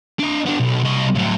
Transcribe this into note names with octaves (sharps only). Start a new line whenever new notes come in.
D4 D#5
B3 D4
B1
C2 D#5
A2 F#3